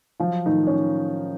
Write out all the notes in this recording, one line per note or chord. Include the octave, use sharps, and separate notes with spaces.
F3 F#3 F4
A2 D#3 D#4
C#4